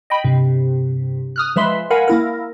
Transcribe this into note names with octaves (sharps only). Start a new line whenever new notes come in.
D#5 G5 B5
G2 C3
D#6 F6 F#6
F3 G#3 B4 E5 B5 C6
A#4 F5 F#5 G#5 B5
A#3 E4 A#4